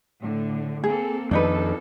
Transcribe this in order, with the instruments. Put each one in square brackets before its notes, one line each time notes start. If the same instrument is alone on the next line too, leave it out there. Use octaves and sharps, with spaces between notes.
[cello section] A2 D3
[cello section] A#3 C4 A4 [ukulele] G#4
[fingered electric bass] F2 D#3 [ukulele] D4 D#4 B4 [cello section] A4